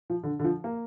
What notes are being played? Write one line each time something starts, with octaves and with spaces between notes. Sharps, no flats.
F3
D3
D3
F3
A#3